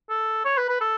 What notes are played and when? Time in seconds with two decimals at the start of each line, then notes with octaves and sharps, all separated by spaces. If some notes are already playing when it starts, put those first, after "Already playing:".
0.10 A4
0.45 C#5
0.57 B4
0.69 B4
0.81 A4